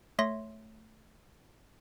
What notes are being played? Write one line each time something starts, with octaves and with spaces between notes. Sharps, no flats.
A3 C#5 E5 C6 A#6